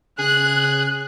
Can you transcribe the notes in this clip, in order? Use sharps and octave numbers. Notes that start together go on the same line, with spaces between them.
C#3 G#4 F#6